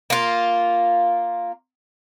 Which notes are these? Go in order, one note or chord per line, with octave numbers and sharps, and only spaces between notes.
A#3 F4